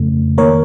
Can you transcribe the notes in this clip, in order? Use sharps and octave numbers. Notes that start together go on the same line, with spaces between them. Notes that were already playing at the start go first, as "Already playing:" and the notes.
Already playing: F2 C#3 A3
D#3 A#3 A#4 C#5